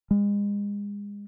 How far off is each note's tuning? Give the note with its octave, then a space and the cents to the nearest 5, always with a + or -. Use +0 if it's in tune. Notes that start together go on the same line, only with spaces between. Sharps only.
G#3 -35